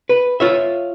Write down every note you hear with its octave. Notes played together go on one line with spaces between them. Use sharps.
B4
F4 C#5 E5